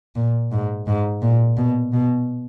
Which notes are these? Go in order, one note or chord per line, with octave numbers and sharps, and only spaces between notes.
A#2
G#2
G#2
A#2
B2
B2